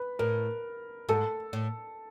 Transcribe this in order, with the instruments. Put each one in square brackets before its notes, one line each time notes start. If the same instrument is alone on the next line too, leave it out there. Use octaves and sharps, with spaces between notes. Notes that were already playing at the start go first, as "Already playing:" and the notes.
Already playing: [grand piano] B4
[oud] A2 [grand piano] A#4
[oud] G#2 [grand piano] A4
[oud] A2